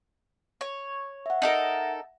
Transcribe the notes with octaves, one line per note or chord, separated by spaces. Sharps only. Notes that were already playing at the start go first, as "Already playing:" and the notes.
C#5
E5 F#5
D#4 A4 A#4